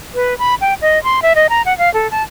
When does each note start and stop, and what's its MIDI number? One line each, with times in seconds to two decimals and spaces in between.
0.15 0.37 71
0.38 0.55 83
0.61 0.74 79
0.82 1.02 75
1.04 1.20 84
1.22 1.33 76
1.36 1.47 75
1.49 1.62 82
1.66 1.76 78
1.78 1.92 77
1.94 2.10 69
2.11 2.23 81